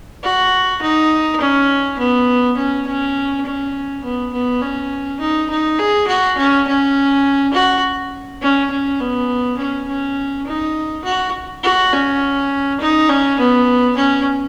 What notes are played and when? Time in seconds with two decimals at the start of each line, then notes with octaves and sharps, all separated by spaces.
0.24 F#4
0.82 D#4
1.41 C#4
1.99 B3
2.57 C#4
2.87 C#4
3.45 C#4
4.04 B3
4.33 B3
4.62 C#4
5.20 D#4
5.50 D#4
5.79 G#4
6.08 F#4
6.38 C#4
6.67 C#4
7.53 F#4
8.42 C#4
8.70 C#4
9.00 B3
9.58 C#4
9.88 C#4
10.47 D#4
11.04 F#4
11.64 F#4
11.93 C#4
12.80 D#4
13.09 C#4
13.39 B3
13.97 C#4